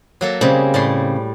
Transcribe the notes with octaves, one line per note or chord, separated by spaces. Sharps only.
F#3 A#3 A4
C#3 G3 G#3 C4
A2 G3 C6